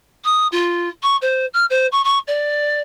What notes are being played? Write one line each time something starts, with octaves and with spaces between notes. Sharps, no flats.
D#6
F4
C#6
C5
F6
C5
C#6
C#6
D5